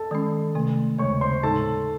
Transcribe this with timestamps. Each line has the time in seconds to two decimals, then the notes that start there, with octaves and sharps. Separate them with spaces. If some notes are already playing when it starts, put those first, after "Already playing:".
Already playing: A4 A5
0.11 D#3 G#3 C#4
0.55 C3 D#3 A3
0.98 D#2 C#3 G#3 C#5 C#6
1.21 C5 C6
1.43 A2 G#3 D#4 A4 A5